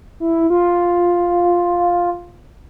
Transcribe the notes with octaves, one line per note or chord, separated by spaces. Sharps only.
E4
F4